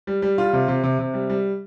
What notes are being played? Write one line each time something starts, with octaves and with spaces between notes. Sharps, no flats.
G3
G3
F4
C3
C3
C3
C3
G3
G3